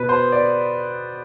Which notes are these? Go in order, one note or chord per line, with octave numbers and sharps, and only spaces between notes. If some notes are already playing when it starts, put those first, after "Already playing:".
Already playing: B2 B3 B4
C5
D5